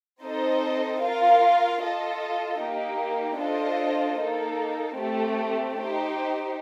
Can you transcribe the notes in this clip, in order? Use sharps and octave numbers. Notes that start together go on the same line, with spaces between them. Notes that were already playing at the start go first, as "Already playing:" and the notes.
C4 D#4 A4 C5 D#5
F4 A#4 F5
F4 A4 D#5
A#3 D#4 G4
D4 F4 A4 C5 D#5
A#3 D#4 A4
A3 C4 G4
D#4 G4 C5